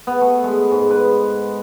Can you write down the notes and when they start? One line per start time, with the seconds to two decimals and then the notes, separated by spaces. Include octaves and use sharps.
0.07 B3
0.21 A3
0.44 G#3
0.71 G#2
0.91 B4